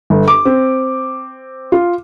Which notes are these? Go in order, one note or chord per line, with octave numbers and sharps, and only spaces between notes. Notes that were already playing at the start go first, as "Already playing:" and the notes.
G1
D6
C4
F4